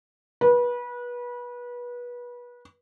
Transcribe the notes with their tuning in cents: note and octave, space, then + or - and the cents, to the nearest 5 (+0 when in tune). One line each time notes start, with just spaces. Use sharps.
B4 -25